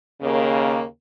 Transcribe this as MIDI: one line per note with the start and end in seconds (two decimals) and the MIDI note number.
0.22 0.82 39
0.22 0.82 49
0.22 0.82 58